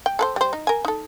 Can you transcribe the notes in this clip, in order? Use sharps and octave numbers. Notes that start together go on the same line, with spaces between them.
G5
A4 B4 C5
G3 C5
D#4
A#4 G#5
D#4 A4